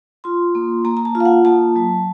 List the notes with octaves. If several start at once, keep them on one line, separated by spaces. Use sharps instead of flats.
F4 C6
A#3
A#3 A#5
A#5
A5
F4
F5
F#5
A#3 A5
F#3